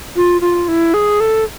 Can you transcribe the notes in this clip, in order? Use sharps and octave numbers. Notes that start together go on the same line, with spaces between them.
F4
F4
E4
G#4
A4